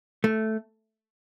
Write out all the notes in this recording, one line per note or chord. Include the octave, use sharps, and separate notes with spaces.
A3